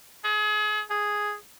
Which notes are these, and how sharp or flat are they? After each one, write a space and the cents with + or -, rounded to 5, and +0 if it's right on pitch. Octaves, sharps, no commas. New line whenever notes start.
G#4 +35
G#4 +0